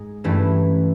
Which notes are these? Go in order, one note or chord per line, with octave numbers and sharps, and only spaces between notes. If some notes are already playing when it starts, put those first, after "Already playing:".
Already playing: G#2 G#3
G2 E3 A3 C#4 E4